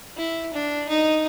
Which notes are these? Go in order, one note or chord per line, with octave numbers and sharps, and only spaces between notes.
E4
D4
D#4 D#5